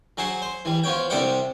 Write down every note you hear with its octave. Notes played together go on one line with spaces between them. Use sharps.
F#3 G#4 C5 F#5
C5
E3 G3
F3 B3 C#5 G5
C2 C3 G3 D5 F#5 G5